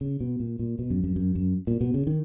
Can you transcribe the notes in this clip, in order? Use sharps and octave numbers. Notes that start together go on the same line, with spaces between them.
C#3
B2
A#2
A#2
B2
F#2
F#2
F#2
F#2
A#2
B2
C#3
D#3